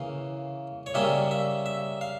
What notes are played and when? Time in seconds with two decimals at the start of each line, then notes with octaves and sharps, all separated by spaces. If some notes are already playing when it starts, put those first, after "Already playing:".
Already playing: C#3 E3 A#3 F5
0.86 C#5
0.94 C#3 G3 A#3 C#4 E5
1.31 E5
1.66 E5
2.01 F5